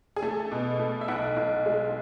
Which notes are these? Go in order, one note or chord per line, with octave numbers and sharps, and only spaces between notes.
G#4
A3 A4
B2
A3
E5
B1 F#5
B1
G#3